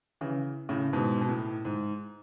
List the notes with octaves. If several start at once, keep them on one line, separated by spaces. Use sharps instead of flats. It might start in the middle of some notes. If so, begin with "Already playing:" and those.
C#3 E3
A2 C#3
G#2 B2
B2
A2
G#2